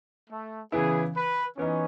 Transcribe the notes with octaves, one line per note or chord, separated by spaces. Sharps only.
A3
C#3 E3 B3 E4 G#4
B4
E3 B3 C#4 D#4